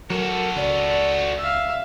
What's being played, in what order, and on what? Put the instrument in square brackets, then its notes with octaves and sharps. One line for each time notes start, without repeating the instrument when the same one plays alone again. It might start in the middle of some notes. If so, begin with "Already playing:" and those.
[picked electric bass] F#3 [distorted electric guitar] F#4 A4 [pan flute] A#4
[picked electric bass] C#2 [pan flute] D5
[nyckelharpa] E5 F5